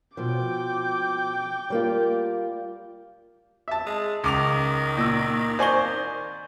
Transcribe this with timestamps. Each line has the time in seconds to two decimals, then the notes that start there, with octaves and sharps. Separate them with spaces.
0.17 B2 F3 G5 D6
1.70 G3 A#3 F4
3.68 E5 A5
3.86 G#3
4.24 C#2 D#3 D6 F7
4.97 A#2 E6
5.59 C5 D5 G#5 C#6 G7